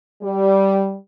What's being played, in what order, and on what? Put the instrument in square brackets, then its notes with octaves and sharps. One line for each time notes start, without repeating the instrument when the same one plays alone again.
[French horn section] G3